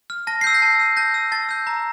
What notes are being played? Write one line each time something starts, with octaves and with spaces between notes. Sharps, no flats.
F6
A5 A#6
G6 C7
E6
G6 A#6
A5
E6 G6
A5 G6 A#6
E6 G6
A5 A6
E6 G6
A#5